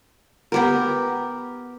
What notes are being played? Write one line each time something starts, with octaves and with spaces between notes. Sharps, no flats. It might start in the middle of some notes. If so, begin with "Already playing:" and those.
B3 G4 A#4